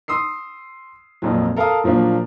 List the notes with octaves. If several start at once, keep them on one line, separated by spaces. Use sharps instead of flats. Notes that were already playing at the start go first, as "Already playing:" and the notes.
C6 D#6 E6 C7
G#1 F2 A#2 F3 F#3
A4 A#4 F5 A5 A#5 D#6
A#2 F3 F#3 A#3 D4